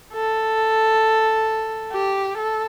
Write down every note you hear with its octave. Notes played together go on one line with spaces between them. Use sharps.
A4
G4
A4